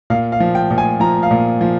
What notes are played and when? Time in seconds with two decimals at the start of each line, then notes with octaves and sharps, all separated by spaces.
0.10 A#2 F5
0.32 F5
0.40 F3
0.55 G5
0.71 A#2
0.78 G#5
1.00 F3 A#5
1.23 F5
1.31 A#2
1.61 F3